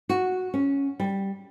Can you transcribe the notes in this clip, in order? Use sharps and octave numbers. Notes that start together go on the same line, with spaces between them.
F#4
C#4
G3